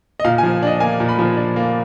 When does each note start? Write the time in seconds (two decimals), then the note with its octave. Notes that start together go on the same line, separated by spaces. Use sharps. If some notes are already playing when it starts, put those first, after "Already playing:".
0.20 D#5
0.24 A#2 F5
0.38 G#5
0.43 F3
0.62 D4 D#5
0.80 A#3 G#5
1.00 A#2
1.09 B5
1.19 F3
1.37 D4
1.56 A#3